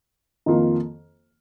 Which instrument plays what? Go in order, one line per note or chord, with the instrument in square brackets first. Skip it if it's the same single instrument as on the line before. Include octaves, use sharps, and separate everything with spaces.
[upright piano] F2 D#3 A#3 F4